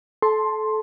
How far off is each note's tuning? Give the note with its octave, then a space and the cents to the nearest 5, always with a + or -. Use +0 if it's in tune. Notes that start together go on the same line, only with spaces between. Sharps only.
A4 -25 A5 +0 C6 +10